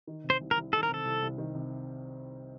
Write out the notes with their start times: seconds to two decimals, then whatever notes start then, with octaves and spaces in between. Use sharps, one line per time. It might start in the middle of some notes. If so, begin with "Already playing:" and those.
0.07 D#3
0.24 C3
0.30 C5
0.41 C2
0.51 A#4
0.57 C2
0.73 D#3 A4
0.83 A#4
0.89 C3
0.94 A4
1.05 C2
1.22 C2
1.38 D#3
1.55 C3